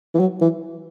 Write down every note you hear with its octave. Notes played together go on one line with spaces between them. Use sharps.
E3
F#3
E3